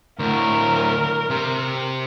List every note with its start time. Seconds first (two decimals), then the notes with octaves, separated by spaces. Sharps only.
0.19 D2 A2 A#4
1.30 C3